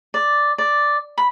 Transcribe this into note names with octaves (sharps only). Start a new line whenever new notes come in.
D5
D5
B5